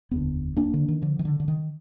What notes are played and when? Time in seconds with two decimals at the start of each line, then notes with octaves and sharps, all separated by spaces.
0.11 F1 D#2 D3 B3
0.56 A#3 D4
0.74 D3
0.89 D#3
1.02 D3 F3
1.19 D#3
1.25 D3
1.40 D3
1.48 D#3